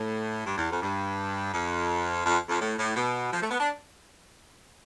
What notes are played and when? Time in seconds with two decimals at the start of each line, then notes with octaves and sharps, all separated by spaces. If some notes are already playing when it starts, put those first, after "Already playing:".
Already playing: A2
0.46 G2
0.58 E2
0.71 F2
0.82 G2
1.54 F2
2.26 F2
2.49 F2
2.61 A2
2.78 A2
2.96 B2
3.33 F3
3.41 A3
3.51 B3
3.60 D4